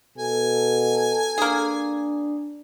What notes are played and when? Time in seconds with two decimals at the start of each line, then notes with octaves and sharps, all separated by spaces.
0.18 B2 A4 G#5
1.38 A#3 D4 G#4